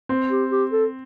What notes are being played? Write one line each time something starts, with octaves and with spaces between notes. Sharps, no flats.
C4
G4
G4
A4